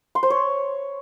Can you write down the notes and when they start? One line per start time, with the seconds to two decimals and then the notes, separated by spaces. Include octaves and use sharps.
0.15 C6
0.23 C5
0.30 C#5